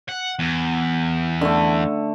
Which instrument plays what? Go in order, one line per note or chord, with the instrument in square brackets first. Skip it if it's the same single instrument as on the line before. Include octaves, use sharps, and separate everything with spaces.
[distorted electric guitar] F#5
E2
[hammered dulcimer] D3 A3